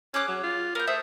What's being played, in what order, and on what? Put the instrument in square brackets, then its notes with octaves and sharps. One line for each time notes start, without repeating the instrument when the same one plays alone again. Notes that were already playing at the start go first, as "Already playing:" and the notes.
[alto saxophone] C#4 [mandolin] G#4 D6 F#6
[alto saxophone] F#3
F4
[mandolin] B3 G6 [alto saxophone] A#4
[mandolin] A3 C5 D#6 [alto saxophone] E5